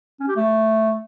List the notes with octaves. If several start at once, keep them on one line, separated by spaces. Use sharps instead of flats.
C#4
G4
A3